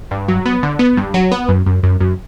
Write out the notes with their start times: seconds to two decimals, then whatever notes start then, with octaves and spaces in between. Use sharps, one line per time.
0.11 G2
0.28 F#3
0.46 B3
0.63 D3
0.79 B3
0.97 G2
1.14 F#3
1.32 B3
1.48 F#2
1.66 F#2
1.83 F#2
2.00 F#2